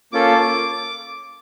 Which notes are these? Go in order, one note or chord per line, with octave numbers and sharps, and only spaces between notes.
A#3 C#4 F4 A4 D6